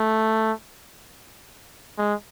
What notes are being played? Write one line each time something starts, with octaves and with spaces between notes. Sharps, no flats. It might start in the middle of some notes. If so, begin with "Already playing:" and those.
Already playing: A3
G#3